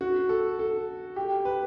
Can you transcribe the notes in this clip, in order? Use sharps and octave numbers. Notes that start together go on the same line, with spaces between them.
F#4
A4
A4
G4
B4